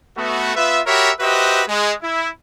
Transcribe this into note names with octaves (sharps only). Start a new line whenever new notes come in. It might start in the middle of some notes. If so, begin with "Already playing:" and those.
A3 B3 F#4
B3 F4 B4 E5
F#4 G4 A#4 C#5 E5 B5
F#4 G4 B4 C5 D#5 E5
G#3
E4